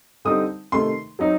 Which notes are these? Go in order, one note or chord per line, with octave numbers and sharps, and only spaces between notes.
D3 G3 C4 D#4 D#6
C3 D#3 A3 C6
F#3 C4 D#4